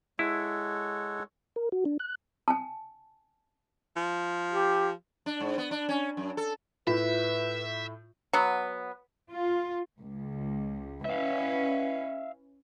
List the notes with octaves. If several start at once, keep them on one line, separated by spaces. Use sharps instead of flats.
G#3 E4 A4 C#5 F#5
A#4
F#4
D4
F#6
G#5 A5
F3
G4
D4
G#2
B3
D4
C#4
F#2
A4
A2 E4 F4 B4 E5
F#3 B3
F4
C#2
C#4 E4 B4 E5 F5